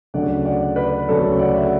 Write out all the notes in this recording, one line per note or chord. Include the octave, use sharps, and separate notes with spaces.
D2 C#3 F#3 A3 D4 D5 F#5
D5 F#5
B4 D5
D2 C#3 F#3 A3 D4 A4 C#5
D5 F#5
E5
F#5